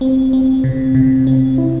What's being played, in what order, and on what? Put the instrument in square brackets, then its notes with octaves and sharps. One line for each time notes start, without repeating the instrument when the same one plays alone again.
[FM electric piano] C4
C4
C3
C3
C4
E4